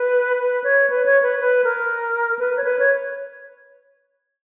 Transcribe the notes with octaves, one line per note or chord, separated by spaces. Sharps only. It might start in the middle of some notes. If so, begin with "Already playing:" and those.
Already playing: B4
B4
C#5
B4
C#5
B4
B4
A#4
B4
C#5
B4
C#5